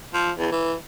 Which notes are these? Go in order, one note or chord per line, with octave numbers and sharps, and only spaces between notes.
F3
E2
E3